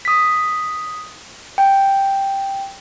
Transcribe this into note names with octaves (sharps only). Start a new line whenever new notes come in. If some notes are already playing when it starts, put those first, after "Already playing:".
D#6 B6
G5